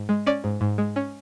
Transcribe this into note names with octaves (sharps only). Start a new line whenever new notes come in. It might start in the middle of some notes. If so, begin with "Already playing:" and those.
Already playing: G#2
G#3
C#4 D5
G#2
G#2
G#3
C#4